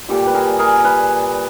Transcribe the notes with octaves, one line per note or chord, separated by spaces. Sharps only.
A#2 G3 G4 A4
B4
G#4 A#4
G#4 A#4
B4